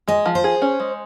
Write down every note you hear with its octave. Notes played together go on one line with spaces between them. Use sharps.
G#3 D#5
F3
C5
G#4
C#4
G#3